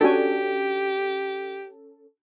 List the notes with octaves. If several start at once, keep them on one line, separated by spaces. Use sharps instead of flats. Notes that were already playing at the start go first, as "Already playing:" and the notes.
C#4 D4 F#4 G4 A4 G#5